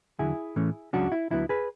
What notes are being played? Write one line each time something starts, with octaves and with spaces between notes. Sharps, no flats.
E2 D3 F#3 E4 G#4
A2 E3 A3 C#4
C#2 C#3 F#3 C#4 D4 F#4
E4
D2 D3 F#3 B3 E4
G#4 B4